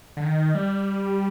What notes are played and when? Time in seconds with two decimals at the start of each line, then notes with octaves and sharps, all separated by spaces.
0.17 D3
0.24 D#3
0.55 G3